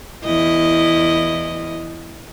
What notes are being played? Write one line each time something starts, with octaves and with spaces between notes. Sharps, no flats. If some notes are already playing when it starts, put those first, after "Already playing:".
E2 E4 D#5